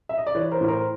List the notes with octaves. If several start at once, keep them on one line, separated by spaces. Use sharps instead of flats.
E5
D#5
D5
E3 B4 C#5
A#4 C5
A2
A#4 C5